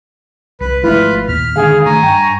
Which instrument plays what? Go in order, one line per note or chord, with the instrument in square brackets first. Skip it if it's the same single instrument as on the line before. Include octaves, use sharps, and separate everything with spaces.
[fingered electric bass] C2 [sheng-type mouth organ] B4
[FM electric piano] G#1 E4 [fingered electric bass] F3 G#3 A3 [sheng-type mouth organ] F4 B4
[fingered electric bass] D#2 [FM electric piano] A#2 [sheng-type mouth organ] F6 [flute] B6
[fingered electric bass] D3 D#3 G#3 [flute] G#4 [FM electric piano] F5
[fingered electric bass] D#3 A3 [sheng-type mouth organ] G#5 A#5 [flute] C#6
[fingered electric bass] G2 [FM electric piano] G5